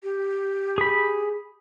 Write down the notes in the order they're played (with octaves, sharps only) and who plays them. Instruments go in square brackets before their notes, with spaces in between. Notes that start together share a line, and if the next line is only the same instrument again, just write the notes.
[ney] G4
[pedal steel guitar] G#4 B5